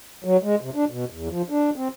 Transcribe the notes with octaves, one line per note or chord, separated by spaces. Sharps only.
F#3
G#3
C3
D4
B2
E2
F3
D4
C4